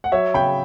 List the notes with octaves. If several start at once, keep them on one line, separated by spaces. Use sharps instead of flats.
F#5
F#3 C#5 E5
C#3 G5 B5